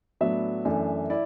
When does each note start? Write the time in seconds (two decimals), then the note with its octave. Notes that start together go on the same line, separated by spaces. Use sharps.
0.21 A2 F#3 B3 D4 E5
0.65 F#2 E3 A3 D4
1.10 E4 D5